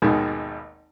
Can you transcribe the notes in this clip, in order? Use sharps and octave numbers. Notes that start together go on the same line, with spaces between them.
G#1 D#2 B2 D#3 G#3